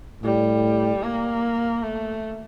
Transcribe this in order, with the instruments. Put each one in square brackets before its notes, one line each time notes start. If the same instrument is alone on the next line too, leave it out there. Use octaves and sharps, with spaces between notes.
[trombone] A2 [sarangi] G3
[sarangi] A#3
A3